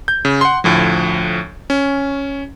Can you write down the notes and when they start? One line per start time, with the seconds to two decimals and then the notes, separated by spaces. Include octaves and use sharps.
0.08 G6
0.25 C#3
0.41 F#5 C6
0.64 D2 A2 F3
1.70 C#4